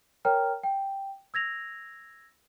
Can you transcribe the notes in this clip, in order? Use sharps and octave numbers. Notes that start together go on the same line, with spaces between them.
A#4 C#5 G5 A#5 F6
G5
E6 G#6 A#6 F7